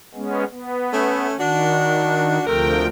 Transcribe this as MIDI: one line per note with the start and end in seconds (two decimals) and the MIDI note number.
0.14 0.44 56
0.14 0.44 59
0.14 0.44 61
0.50 1.27 59
0.92 1.33 57
0.92 1.33 61
1.37 2.38 51
1.37 2.41 62
1.37 2.41 66
2.45 2.87 38
2.45 2.86 48
2.45 2.87 53
2.45 2.86 57
2.45 2.86 70
2.45 2.87 79